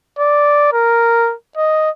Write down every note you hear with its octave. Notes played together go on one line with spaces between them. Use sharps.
D5
A#4
D#5